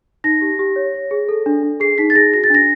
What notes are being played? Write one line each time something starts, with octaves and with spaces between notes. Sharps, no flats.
D#4 A#6
G4
G4
C#5
C#5
G#4
A4
D4
D4
G#4 C7
D#4 B6
A6
G#4 A#6
F#4 A#6
A6
D4 A#6